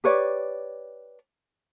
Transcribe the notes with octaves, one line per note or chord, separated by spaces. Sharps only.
G4 B4 C#5 D5